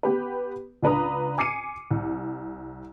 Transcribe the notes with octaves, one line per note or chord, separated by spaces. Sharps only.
B3 G4 B4
C#2 D4 B4 A#5 D#6
G#5 D6 C7 C#7 D#7
C2